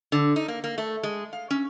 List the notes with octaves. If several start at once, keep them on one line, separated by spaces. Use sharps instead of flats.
D3
D#4
A#3
A#3
A3
G#3
F5
C#4